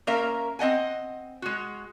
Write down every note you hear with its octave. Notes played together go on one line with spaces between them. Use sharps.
A#3 C#4 A#4 E5 F5
C4 D#5 F#5 G#5
G#3 F#4